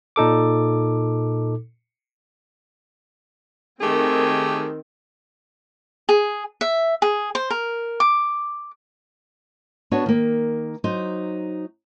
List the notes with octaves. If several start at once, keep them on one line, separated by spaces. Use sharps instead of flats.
A#2 D#4 A4 D6
D#3 A3 C4 G4 G#4
G#4
E5
G#4
C5
A#4
D6
B3 D4 F#4 B4 C#5
D#3 A#3
F#3 D#4 C5